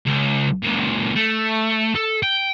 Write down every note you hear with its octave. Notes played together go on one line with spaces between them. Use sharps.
C#2
C#2 A#2
A3
A4
G5